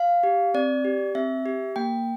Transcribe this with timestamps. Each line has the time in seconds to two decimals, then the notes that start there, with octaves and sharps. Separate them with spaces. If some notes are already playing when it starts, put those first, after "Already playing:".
Already playing: F5
0.23 G4
0.54 C4 D5
0.85 G4
1.15 C4 E5
1.46 G4
1.76 A#3 G5